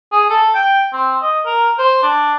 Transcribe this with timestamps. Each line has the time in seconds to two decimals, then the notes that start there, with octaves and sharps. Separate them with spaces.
0.12 G#4
0.30 A4
0.54 G5
0.93 C4
1.22 D#5
1.46 A#4
1.79 C5
2.03 D4